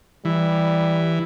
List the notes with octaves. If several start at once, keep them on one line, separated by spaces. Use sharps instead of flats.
E3 G3